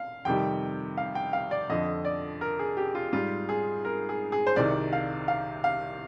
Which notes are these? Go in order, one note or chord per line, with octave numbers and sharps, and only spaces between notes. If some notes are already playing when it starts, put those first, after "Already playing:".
Already playing: F5
F2 C3 D#3 G3 G5
F5
G5
F5
D5
F2 D3 F3 D#5
D5
A#4
G#4
G4
F4
G#2 G3 F4
G#4
A#4
G#4
G#4
C5
C2 C3 D#3 D5
F5
F5
F5